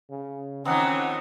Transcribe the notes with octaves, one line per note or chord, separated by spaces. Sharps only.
C#3
D#2 E3 F3 C4 C#4 D#4 F#5